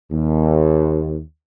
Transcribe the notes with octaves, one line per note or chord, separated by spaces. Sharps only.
D#2